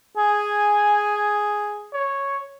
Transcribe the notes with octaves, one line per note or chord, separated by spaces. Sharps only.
G#4 G#5
C#5